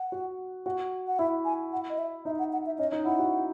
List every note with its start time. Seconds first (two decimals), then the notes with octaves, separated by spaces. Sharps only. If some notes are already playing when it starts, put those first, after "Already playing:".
Already playing: F#5
0.12 F#4
0.66 F#4
1.08 F#5
1.19 E4 E5
1.45 G#5
1.73 F#5
1.89 D#5
1.99 E5
2.25 D#4 E5
2.39 F#5
2.53 F#5
2.66 E5
2.78 C#4 D#5
2.92 D#4
3.05 E4 F#5
3.19 F#4